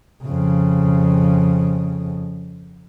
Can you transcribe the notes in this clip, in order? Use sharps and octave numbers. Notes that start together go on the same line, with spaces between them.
F2 C#3